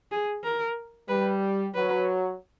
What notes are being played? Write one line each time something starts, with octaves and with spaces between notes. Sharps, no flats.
G#4
A#4
G3 B4
F#3 B4